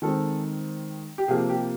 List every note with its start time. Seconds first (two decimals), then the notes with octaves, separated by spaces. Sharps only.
0.02 D#3 G#3 C4 A4
1.18 G4
1.28 C3 F3 A#3 G#4
1.49 G4